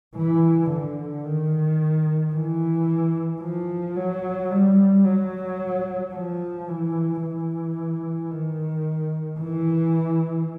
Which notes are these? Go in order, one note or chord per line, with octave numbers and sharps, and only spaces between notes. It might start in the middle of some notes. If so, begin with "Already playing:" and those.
E3
D3
D#3
E3
F3
F#3
G3
F#3
F3
E3
E3
D#3
E3